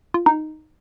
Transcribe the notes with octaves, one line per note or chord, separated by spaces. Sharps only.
F4
D#4